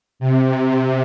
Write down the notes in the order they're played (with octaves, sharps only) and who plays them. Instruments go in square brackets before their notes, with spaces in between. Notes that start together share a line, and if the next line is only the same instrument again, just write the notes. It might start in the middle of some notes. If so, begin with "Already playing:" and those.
[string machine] C3